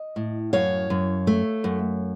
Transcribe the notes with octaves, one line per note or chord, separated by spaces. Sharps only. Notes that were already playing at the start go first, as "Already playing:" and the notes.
Already playing: D#5
A2
F#2 C#5 F5
F#2
A3
F#2